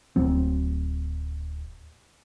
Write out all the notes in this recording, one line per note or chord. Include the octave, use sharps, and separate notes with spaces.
D1 F#3 C4